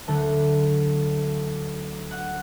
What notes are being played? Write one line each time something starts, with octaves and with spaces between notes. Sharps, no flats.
D2 D3 F#3 A3 A4
F#5